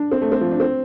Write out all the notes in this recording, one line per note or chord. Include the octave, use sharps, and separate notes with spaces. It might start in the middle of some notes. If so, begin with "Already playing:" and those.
Already playing: D4
C4
A3
C4
F3
D4
C4